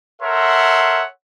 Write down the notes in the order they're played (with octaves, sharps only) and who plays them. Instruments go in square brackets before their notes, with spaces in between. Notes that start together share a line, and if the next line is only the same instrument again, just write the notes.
[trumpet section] A4 A#4 C#5 E5 F#5 C6